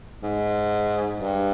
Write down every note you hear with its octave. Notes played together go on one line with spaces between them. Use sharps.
G#2
G2